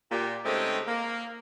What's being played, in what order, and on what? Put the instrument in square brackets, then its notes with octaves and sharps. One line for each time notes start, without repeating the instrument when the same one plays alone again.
[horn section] A#2 G4
C#3 G#3 A3 C4 D#4 G4
A#3